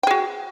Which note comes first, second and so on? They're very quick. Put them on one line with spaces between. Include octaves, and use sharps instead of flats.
G5 G#4 F#4